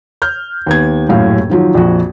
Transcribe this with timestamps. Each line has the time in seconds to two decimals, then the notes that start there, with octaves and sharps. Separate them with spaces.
0.22 F6 G6
0.67 D#2 B3 G#6
1.09 D#1 F#2 A2 F5
1.50 D#3 F3 F#3
1.74 A#1 F2 F#4